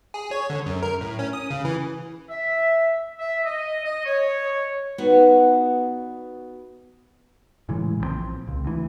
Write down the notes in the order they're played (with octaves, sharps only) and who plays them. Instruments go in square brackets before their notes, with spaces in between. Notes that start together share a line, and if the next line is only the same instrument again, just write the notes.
[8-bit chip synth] G#4
C#5
D3
F#2
A#4
A2
C#4
D#6
C#3
E3
[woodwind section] E5
E5
D#5
D#5
C#5
[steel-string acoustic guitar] B2 B3 D#4 F#4 D5 F#5
[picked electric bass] A2 C#3 E3 G#3
A#1 C#3 C4
C#2
D2 E3